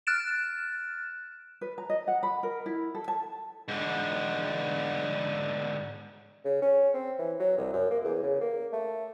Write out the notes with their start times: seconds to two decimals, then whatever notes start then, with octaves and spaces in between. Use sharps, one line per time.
0.07 F6 F#6 A6 D7 E7
1.61 B4
1.78 A#5
1.90 D#5
2.08 F#5
2.23 B5
2.43 A#4
2.66 E4
2.95 A4
3.08 A5
3.68 G#2 D3
6.45 C#3
6.62 C#4
6.94 C4
7.19 E3
7.40 F#3
7.58 C2
7.73 F#2
7.91 A#3
8.04 E2
8.23 C#3
8.41 A#3
8.73 A3